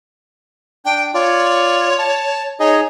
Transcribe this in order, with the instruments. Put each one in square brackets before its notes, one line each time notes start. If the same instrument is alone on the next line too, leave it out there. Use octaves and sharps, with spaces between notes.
[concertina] D4 [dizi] G5
[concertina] F4 D5 [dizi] C#5
[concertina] A5
[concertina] D#4 G#4 D#5 [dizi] C#5